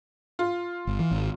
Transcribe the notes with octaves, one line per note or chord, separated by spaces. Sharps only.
F4
G1
E3
G#1